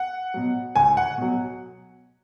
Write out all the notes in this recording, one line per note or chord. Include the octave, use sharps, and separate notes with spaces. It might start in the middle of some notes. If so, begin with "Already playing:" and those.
Already playing: F#5
B2 F#3
C#2 G#5
F#5
B2 F#3